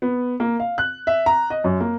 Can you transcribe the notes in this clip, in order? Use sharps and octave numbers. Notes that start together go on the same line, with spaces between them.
B3
A#3
F5
F#6
E5
A#5
D#5
F#2
A#3